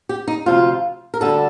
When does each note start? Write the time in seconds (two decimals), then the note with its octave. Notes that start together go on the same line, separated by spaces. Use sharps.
0.09 G4
0.28 D#4
0.46 D2 C3 F3 F4
1.14 A#4
1.21 D2 D3 G3 A4